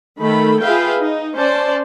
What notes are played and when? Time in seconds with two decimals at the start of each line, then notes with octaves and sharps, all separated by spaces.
0.20 D#3 A3 A4 B5
0.62 F4 G#4 B4 E5 F5 G5
0.99 D#4
1.37 C#4 C5 D5 A5